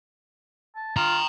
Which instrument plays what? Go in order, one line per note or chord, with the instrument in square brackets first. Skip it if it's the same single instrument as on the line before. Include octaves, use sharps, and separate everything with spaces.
[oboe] A5
[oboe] F4 [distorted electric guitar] G5 A#5